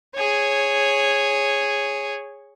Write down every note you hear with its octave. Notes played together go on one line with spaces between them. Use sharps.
G#4 C#5